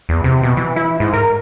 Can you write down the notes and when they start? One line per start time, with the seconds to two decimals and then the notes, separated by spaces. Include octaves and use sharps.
0.09 E2
0.24 C3
0.43 B2
0.57 E3
0.76 E4
1.00 G#2
1.14 A#4